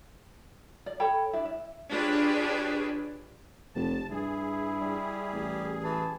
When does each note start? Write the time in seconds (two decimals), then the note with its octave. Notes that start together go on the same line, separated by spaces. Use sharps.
0.86 D5
1.00 A4 C#5 G5 B5
1.33 D4 E4 D5
1.45 E5
1.90 D4 F4 G4 G#4 B4 C#5
3.75 F1 A5
4.11 G2 E4 G#4
4.81 G3
5.33 A1
5.84 E3 A5